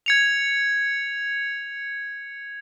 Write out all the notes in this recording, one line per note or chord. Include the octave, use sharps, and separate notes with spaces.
G#6 C#7 F7